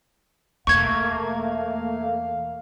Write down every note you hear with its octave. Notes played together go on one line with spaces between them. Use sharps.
E2 B2 A3 A#3 F5 C#6 G#6